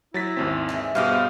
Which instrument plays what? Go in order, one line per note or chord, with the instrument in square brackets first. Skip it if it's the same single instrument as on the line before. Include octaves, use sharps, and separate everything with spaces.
[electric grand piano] F#3 A6 B6 [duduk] E4
[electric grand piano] G#1 D#2 C4
[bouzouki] D3 E3 G#3
[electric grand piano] G2 B2 [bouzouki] G#3 D#4 C5 [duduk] G4 [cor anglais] F5